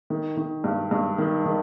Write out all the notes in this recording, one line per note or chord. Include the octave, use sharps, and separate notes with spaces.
D#3
D#3
G2
G2
D#3
D#3